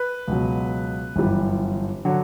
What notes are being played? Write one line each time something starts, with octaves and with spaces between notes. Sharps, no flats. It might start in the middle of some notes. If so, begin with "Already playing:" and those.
Already playing: B4
C#2 B2 F#3
G1 F#2 E3 G3
D3 F#3